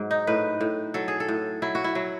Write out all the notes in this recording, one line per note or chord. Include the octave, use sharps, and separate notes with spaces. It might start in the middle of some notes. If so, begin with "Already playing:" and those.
Already playing: G#2 F#3
D#4
A2 B4
A2
F#3 A4
G#4
A4
A2
F#3 E4
F#4
E4
F#3